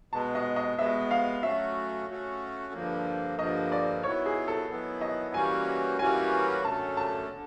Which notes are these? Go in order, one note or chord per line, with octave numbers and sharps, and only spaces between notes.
B2 G#3 B3 A5
D#5
D#5
B2 G#3 B3 E5
F5
F#3 A3 C#4 F#4 E5
F#3 A3 C#4 F#4
G2 D3 F3 A#3
G2 D3 F3 A#3 D#5
D5
D#3 F#3 B3 E4 C#5
G#4
A4
D#3 F#3 B3 E4
D#5
E3 G3 A#3 C#4 F#4 G#5
E3 G3 A#3 C#4 F#4 G#5
F#2 D3 F#3 A3 C#4 A5
A5
D3